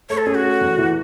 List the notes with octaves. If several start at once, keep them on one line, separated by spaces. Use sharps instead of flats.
A3 C#5
A4
C#4 G#4
F#4
A3
E2
E3